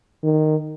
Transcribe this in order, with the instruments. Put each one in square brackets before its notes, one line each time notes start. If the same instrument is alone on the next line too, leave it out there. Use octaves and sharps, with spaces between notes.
[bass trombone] D#3